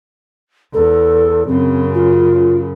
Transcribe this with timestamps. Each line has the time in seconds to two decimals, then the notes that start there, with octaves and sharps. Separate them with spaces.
0.74 E2 A4
1.48 F#2 C#3 C4
1.94 F4